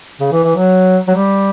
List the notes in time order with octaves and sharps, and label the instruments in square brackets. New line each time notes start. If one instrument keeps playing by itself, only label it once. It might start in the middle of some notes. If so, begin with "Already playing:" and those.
[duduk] C#3
E3
E3
F#3
F#3
G3